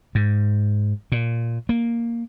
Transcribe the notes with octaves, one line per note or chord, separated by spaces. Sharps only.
G#2
A#2
A#3